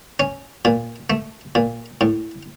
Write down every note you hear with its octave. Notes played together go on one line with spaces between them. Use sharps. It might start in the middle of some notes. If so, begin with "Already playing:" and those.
C#4
A#2
A3
A#2
A2